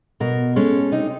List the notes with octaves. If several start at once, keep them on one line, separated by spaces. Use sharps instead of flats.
B2 A#4
G#3 C#4 A4
C3 D#4